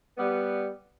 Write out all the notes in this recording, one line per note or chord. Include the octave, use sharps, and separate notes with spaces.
G3 B3